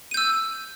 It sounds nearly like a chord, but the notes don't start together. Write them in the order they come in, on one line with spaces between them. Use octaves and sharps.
D#7 G6 E6